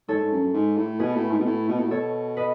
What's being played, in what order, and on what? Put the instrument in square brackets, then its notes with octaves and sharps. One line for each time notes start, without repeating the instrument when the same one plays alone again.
[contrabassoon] G#2 [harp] A4 C#5
[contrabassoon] G#2
F#2
F#2
G#2
A2
[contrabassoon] B2 [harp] G#4 B4
[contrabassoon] A2
G#2
B2
A2
B2
A2
[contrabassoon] B2 [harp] A4 C#5
[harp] B4 D#5